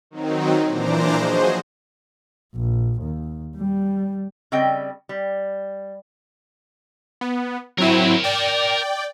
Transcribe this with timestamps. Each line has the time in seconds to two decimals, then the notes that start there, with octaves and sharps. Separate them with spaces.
0.11 D#3 F#3 C4 D#4
0.67 A#2 E3 D4 C5 A#5 D6
1.18 F3 F#3 F#4 G#4 C5 D#5
2.55 A#1
3.01 D#2
3.56 G3
4.52 C#3 G3 C4 D#5 G5
5.09 G3
7.21 B3
7.78 F#3 C4 E4 A#4 G#5
8.24 D5 G5